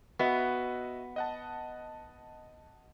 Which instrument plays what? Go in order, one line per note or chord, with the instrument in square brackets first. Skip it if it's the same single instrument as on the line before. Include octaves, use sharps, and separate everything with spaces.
[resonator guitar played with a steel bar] B3 [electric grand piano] F#4 D#5 E5
[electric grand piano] D#5 F#5 A5